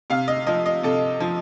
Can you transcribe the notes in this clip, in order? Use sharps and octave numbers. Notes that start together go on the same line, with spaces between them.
C3 F5
D#5
F3 D#5
D#5
C3 A4
F3